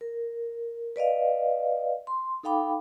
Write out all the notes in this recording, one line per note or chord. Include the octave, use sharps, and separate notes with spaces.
A#4
B4 D5 D#5 F5
C6
D#4 A4 F5 G5 B5 D6